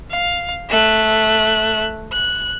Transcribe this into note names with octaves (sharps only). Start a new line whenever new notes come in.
F5
A3 F#6
F#6